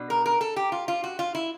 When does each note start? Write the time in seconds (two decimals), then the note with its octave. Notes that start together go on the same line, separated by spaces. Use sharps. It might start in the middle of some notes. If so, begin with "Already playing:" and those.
Already playing: B2 B3 D4
0.10 A#4
0.26 A#4
0.41 A4
0.56 G4
0.72 F4
0.88 F4
1.04 F#4
1.19 F4
1.35 E4